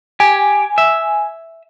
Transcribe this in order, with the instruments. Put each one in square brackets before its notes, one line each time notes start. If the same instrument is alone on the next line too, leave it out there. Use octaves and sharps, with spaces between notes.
[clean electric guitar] G4 [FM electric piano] G#5
[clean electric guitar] E5